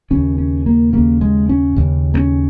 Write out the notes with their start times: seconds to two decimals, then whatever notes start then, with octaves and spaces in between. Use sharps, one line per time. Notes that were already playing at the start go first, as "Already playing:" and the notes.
0.10 D#2 C#3 C#4
0.38 C#4
0.66 A#3
0.93 D#2 C#3 A#3
1.21 G#3
1.49 C#4
1.76 D#2 C#3
2.14 A#3
2.17 C#4